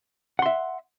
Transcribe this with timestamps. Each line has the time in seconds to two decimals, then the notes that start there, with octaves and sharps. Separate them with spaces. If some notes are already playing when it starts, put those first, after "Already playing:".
0.39 F#5
0.42 C6
0.46 E5